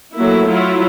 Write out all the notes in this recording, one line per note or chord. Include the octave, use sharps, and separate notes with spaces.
F#3 A3 A#3 E4
F#3 E4 F4